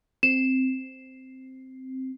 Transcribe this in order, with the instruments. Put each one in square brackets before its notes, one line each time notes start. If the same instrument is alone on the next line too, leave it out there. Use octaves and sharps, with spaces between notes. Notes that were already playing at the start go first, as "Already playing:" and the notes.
[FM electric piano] C4 [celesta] E7